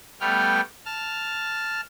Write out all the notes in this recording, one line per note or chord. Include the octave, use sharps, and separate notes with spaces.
G3 A3 B3 G5 F6
A5 F6